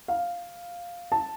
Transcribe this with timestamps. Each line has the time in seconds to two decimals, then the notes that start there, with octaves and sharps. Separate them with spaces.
0.08 F5
1.12 A5